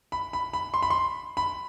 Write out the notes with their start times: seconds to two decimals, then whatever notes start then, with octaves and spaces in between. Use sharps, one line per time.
0.12 B5
0.33 B5
0.53 B5
0.74 C6
0.83 B5
0.90 C6
1.37 B5